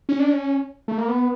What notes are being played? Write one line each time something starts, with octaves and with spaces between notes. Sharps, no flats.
C#4
D4
C#4
A3
A#3
B3